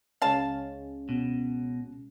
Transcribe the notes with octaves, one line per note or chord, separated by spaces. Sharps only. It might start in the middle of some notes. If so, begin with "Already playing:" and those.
C#2 G#3 C#4 F5 A5
B2